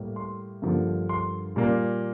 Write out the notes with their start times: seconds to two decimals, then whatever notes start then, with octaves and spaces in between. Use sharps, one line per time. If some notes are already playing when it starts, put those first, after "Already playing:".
Already playing: A2 G3 A#3
0.16 C6
0.62 G2 D3 F3 A#3
1.09 C6
1.56 A#2 G3 A#3